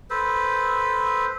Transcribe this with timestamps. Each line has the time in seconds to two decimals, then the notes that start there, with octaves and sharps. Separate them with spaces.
0.10 A4 B4 C5